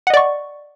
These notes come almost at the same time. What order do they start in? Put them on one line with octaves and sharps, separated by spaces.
F#5 D#5 D5 C#6